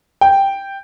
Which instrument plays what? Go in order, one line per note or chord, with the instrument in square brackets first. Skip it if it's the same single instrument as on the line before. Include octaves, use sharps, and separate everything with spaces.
[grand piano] G5